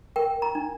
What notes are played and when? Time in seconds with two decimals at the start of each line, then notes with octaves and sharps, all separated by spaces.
0.16 A#4 G5
0.42 A#5
0.55 D4